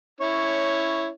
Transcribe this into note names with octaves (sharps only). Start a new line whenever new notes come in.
C#4 E4 C#5